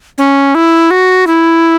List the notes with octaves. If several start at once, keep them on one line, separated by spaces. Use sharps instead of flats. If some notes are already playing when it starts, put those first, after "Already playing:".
C#4
E4
F#4
E4